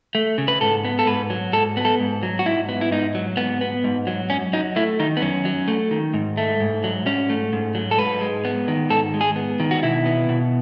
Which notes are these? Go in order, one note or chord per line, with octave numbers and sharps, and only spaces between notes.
A3
C#3
B4
G#2 A4
B3
A4
G#2 B4
F#3
G#2 A4
B3
A4
G#2
F#3
F#4
G#2 E4
B3
E4
G#2 D#4
F#3
G#2 B3
B3
G#2
F#3
F#2 C#4
F#3 D#4
A3 E4
D#3 D#4
B3
F#2 C#4
F#3
A3
D#3
G#2
A3
G#2
F#3
G#2 C#4
A3
G#2
F#3
A4
G#2 B4
G#3
B3
D#3
G#2 A4
G#3
G#4
B3
D#3
F#4
B2 E4
B3
B2